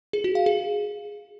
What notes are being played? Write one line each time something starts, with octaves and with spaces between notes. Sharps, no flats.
G#4
F#4
F5
G#4